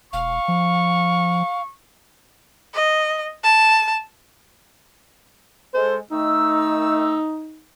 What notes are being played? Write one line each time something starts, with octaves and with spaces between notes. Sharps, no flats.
E1 F5 C#6
F3
D#5
A5
G#3 A4 C5
D#3 A3 D#4 E6